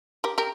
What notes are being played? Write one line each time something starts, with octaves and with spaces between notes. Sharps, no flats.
G4 A#4
G4 A#4